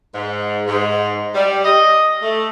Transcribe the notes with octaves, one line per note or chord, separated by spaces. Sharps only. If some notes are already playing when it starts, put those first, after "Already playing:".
G#2
G#2
G3
D#5
A3